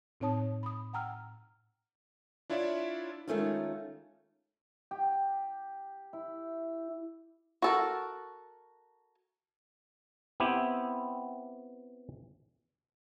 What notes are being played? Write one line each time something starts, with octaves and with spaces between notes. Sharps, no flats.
A2 C4 D#4 C#5 A5 D#6
B5 D#6
F#5 G5 A#5 E6 F6
D4 E4 F4 C#5 D5 E5
D#3 G#3 A3 C#4 D#4 F4
G4
E4
F#4 A4 A#4
B3 C4 E4 G4